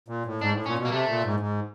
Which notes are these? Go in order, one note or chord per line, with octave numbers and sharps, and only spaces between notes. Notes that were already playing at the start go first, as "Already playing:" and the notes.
A#2
A2
G#2 D4
A2
A#2 C#4
B2
A#3
C3 A3
A#2
G#2
G#2